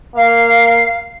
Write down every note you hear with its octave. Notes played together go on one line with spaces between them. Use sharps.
A#3 F5